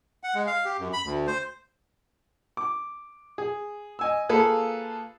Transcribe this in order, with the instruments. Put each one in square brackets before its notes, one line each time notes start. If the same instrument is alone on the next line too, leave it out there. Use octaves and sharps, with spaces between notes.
[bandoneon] F#5
G#3
F5
G4
F#2
B5
D2
C5
[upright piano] D6
G#4
D#5 G#5 E6
A#3 F4 G#4 A4 B4 F5